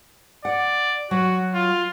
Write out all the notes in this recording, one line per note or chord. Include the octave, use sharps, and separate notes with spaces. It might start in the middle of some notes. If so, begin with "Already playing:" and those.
D5 F#5
F#3 F#4
F4